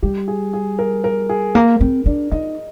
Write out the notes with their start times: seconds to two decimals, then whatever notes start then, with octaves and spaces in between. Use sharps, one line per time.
0.02 G3 G4
0.28 G#4
0.53 G#4
0.79 A#4
1.04 A#4
1.29 G#4
1.55 A#3 A#4
1.81 C4
2.06 D4 D5
2.31 D#4 D#5